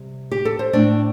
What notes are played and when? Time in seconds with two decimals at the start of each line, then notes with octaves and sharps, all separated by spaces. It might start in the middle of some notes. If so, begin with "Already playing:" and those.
Already playing: C3 G3
0.31 G4
0.45 A4
0.59 C5
0.73 A2 A3 C4 D4 D5